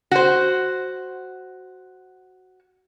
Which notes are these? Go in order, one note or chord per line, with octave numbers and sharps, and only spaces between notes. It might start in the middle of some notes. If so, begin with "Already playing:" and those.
F#4 C5